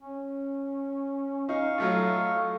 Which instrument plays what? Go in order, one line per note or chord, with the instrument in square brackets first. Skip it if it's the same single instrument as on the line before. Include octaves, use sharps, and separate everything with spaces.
[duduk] C#4
[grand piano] D#4 [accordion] F5 C#6
[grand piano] F#3 A3 F4 [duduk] A4